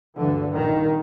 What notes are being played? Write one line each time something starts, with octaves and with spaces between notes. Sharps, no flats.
D2 G2 D3 E3
C2 A#2 D#3